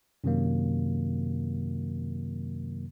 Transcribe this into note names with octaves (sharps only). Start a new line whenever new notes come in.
F#2 C3 D#3 F#3 A#3